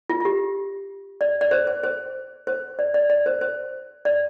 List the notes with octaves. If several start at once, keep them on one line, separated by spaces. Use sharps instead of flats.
F4
F4
G4
D5
D5
C5
C5
C5
C5
D5
D5
D5
C5
C5
D5